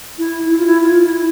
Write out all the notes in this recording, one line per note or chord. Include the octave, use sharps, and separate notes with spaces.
E4
E4
F4
E4
F4
E4